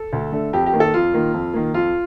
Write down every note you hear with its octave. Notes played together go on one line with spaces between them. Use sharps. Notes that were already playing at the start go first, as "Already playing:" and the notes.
Already playing: A4
D2
D3 A3
F2 G4
G4
D#3 A#3
A4
F2 F4
D#3 A#3
F2
D#3 A#3
F2 F4